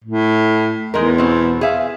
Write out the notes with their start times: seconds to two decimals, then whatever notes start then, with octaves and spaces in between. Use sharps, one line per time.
0.05 A2
0.94 E2 G#3 D#4 A#4
1.18 B2 C4
1.61 G#4 E5 F5